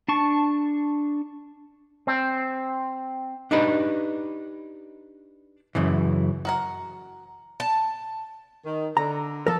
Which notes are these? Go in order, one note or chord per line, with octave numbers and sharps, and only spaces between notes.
D4 A5 C#6
C4
D4 D#4 G4 B4
F#2 C#3 E3
F#4 A#4 F#5
A5
D#3
D3 A#5
F3 A4 A#4